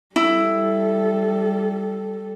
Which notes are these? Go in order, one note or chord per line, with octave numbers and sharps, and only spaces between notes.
G3 E4 A4